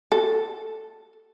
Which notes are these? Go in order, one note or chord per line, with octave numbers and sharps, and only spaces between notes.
A4